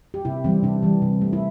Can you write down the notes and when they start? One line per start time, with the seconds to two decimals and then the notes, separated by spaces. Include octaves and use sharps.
0.14 G4
0.25 C3 E4
0.44 E3 G3 C4
0.63 C3 D4
0.83 E3 G3
1.02 C3
1.22 A3
1.33 E4